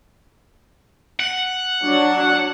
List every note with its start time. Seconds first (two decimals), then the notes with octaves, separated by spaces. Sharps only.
1.20 F#5
1.83 F#3 D4